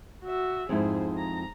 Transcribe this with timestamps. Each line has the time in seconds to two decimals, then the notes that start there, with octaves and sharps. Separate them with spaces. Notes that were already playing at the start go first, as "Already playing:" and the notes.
0.24 F#4 E5
0.69 F2 G#2 E4 G#4 C5
1.17 A#5